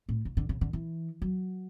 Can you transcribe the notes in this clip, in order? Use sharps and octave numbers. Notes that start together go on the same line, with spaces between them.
A2
C#3
D3
C#3
D3
E3
F#3